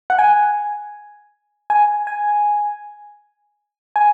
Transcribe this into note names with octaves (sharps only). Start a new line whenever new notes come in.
F#5
G#5
G#5
G#5
G#5